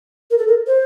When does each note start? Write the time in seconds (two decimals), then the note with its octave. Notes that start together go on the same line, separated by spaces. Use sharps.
0.31 A#4
0.38 A4
0.48 A#4
0.67 C5